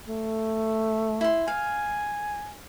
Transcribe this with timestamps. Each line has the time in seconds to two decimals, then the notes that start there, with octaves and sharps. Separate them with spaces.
0.07 A3
1.21 E4 C6
1.48 F5 G#5